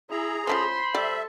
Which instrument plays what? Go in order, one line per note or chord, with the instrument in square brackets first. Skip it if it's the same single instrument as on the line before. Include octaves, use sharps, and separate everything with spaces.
[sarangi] E4 [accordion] G#4 A#5
[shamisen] F3 A3 C#4 [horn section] C5 B5 [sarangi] C6
[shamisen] G3 D5 [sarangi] A4 [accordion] E5